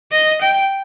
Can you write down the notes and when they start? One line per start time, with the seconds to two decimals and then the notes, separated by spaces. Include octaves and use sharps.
0.12 D#5
0.41 G5